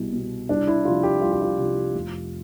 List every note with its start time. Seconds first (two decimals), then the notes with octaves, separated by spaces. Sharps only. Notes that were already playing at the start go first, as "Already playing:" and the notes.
Already playing: C2 B2
0.12 B2
0.49 C2 D4
0.67 E4
0.85 C3 F3 F4
1.03 G4
1.21 C2 F4
1.32 G4
1.42 F4
1.58 C3 F3
1.94 F1